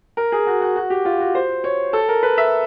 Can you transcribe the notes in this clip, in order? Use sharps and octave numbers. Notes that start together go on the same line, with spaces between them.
A#4
G#4
F#4
F#4
F#4
G4
F4
F#4
C5
C#5
A4
A#4
B4
E5